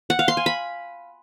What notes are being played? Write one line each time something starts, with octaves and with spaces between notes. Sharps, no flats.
F#5
F5
C6
G#5
B5